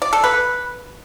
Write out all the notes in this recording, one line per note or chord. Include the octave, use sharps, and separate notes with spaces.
D5
A4
B4